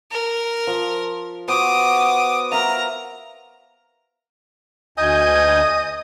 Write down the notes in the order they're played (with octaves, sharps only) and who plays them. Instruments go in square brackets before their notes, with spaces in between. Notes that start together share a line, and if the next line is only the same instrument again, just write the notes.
[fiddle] A#4
[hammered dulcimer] F3
[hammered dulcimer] B3 F#4 C5 [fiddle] D6 D#6
[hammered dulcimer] A#4 E5 F5 [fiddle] A#5
[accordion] D2 G#5 G6 [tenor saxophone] D#5